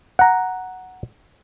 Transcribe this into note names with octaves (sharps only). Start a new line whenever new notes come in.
F#5 A#5